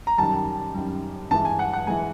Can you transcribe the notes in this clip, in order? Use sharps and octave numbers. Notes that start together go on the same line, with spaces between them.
A#5
F#2 D#3 G3 A5
F#2 D#3 G3
G2 E3 G#3 A5
G#5
F#5
F#5
E3 G#3 G#5